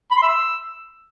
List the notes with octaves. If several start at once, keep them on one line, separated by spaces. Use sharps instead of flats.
B5
C6
E5
E6